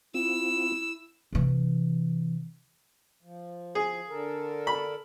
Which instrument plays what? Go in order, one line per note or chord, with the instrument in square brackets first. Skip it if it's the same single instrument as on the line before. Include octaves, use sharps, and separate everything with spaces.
[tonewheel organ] C4 F4 [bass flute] E4 [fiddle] E6
[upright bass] C3 E3
[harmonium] F3
[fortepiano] G#4
[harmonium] D3 A4 A#4
[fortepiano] B5